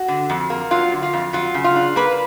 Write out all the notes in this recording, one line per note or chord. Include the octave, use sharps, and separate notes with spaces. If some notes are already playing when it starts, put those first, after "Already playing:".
Already playing: F#4
D3
F2
A#3
F#3 F4
D3
F4
F2
F#3 F4
C#3
F4
D4
A#3 B4